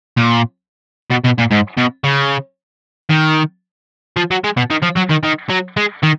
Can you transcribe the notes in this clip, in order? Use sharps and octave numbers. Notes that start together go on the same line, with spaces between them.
A#2
B2
B2
A#2
G#2
B2
C#3
D#3
F3
F#3
G#3
B2
D#3
F3
F#3
D#3
D#3
F#3
G#3
D#3